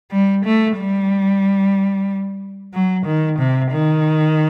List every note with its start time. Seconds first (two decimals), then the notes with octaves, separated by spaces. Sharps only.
0.11 G3
0.44 A3
0.77 G3
2.74 F#3
3.06 D#3
3.39 C3
3.71 D#3